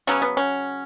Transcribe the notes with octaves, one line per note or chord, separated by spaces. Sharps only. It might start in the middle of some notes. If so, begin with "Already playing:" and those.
C#3 F#3 B3 C#4
B3
C#4